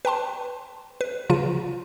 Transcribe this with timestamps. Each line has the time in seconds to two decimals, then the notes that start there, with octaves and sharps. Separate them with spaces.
0.05 B4 G5 A5 C6
1.01 B4
1.30 C#3 F3 F4 D#7